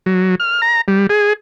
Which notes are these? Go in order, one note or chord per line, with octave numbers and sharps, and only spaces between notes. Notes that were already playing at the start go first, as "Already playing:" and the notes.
F#3
F6
A#5
G3
G#4